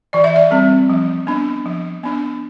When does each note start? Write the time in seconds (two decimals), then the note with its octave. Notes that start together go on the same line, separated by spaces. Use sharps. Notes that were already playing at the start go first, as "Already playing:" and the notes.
0.13 E3 D5
0.24 E5
0.36 D5
0.51 G3 C4
0.89 F3
1.27 B3 D4
1.66 F3
2.03 B3 D4